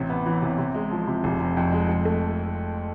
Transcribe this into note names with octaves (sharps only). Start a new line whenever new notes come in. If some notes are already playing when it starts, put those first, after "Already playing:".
Already playing: A1 C3
B3
E3
C3
C3
G#3
F3
C3
F1
C3
F2
G#3
F2
A3